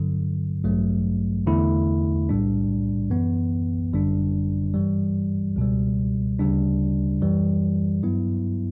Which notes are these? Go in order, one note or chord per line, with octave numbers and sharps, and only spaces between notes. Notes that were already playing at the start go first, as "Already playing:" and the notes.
Already playing: G2 D3 F#3
A1 G2 F#3 A3
E2 D3 A3 E4
B1 A2 G3 D4
F#2 E3 B3
G1 F#2 D3 G3 D4
G2 E3 G3
C#2 B2 G3
D2 C#3 G3 D4
F#2 E3 G3
G2 F#3 B3 E4